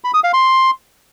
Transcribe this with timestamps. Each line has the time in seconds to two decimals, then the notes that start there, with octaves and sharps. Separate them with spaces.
0.04 B5
0.14 D#6
0.24 F5
0.34 C6